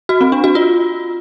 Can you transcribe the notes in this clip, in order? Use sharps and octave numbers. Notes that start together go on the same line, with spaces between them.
F#4
C4
D4
F#4
F4